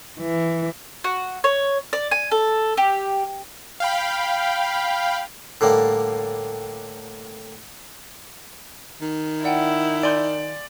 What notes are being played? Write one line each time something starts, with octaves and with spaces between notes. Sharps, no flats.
E3
F#4
C#5
D5
G#5
A4
G4
F5 G5 B5
A2 D3 G3 A#3
D#3
E4 D5 F#5 G5
D5 G#5 C6 G6